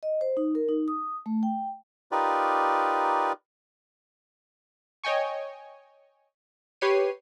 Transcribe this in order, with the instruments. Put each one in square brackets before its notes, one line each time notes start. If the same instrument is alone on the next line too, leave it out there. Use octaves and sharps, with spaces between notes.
[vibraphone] D#5
C5
D#4
A#4
D#4
D#6
A3
G5
[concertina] D#4 F4 G4 A#4 B4 D5
[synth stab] C#5 D#5 G5 G#5 C#6
G4 B4 C#5 C7 D#7